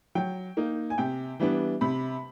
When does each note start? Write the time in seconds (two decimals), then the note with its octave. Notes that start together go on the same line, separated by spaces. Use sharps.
0.15 F#3 G5
0.57 A#3 D#4
0.90 G#5
0.98 C3 G5
1.40 E3 G3 B3 D4
1.81 C3 B5